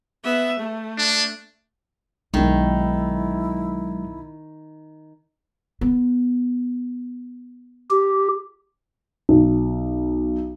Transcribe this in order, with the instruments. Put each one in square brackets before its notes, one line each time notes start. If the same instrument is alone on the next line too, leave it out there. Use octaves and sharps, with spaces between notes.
[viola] B3 E5
A3
[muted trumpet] D4
[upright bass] B1 D4 [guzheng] D#3 [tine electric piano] F#3 G#3 [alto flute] E4
[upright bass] B3
[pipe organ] G4
[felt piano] B1